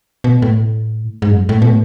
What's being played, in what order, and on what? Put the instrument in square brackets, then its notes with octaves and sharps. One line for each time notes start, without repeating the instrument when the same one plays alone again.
[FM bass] B2
A2
G#2
F#2
A2
B2
A2